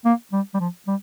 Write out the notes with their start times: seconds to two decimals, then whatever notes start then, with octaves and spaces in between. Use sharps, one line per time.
0.05 A#3
0.32 G3
0.54 G3
0.59 F3
0.87 G3